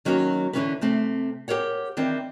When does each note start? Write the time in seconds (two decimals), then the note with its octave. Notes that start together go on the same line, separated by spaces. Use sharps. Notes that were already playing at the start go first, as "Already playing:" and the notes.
0.05 D#3 F#3 A#3 C#4 F#4
0.53 D3 E3 F3 C#4 E4 B4
0.81 C3 A3 C4
1.48 G4 A4 A#4 C#5 F#5
1.97 D#3 E3 C4 D4